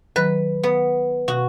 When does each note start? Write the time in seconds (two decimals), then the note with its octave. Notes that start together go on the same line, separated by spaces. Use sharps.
0.16 D#3 F#3 B4 F#6
0.63 B3
1.28 B2 F#4